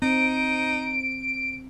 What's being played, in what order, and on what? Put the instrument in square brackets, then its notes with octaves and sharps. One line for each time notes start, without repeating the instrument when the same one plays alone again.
[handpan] C4 [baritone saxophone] D#4 [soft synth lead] D7